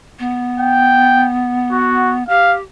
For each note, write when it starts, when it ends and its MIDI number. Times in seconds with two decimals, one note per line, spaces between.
0.19 2.23 59
0.59 1.27 79
1.72 2.14 66
2.29 2.62 67
2.29 2.56 77